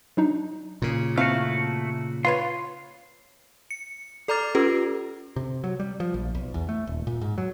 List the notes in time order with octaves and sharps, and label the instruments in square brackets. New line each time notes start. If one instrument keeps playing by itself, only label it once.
[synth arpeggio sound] F#3 D4 D#4
[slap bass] A#2 C#3
[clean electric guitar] A3 F#4 [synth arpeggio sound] C4 E4 [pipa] F5
[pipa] F4 B4 C#5 [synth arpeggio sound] F5 [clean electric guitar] C6
[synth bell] C#7
A4 D5 A#5 D6 F6 A6
C#4 F4 G4 A4 B4
[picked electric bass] C3
F#3
G3
F3
A#1
B1
E2
A3
D#1
A#2
G#2
F#3